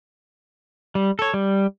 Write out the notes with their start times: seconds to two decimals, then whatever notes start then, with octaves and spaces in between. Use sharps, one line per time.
0.95 G3
1.19 A4 C#5
1.34 G3